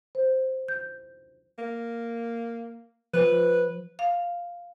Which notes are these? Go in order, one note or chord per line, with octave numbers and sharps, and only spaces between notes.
C5
G6
A#3
F3 B4
F5